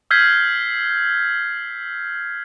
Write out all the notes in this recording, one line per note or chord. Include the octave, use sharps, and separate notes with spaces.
E6 F6 G6 G#6 B6 C7